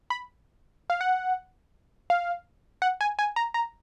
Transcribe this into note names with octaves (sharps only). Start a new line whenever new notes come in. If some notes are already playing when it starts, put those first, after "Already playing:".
B5
F5
F#5
F5
F#5
G#5
G#5
A#5
A#5